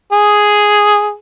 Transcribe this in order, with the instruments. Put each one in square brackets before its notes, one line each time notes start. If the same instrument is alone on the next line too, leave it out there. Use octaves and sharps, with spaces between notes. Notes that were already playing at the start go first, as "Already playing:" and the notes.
[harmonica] G#4